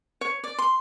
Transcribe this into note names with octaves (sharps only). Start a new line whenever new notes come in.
C#5
D5
C6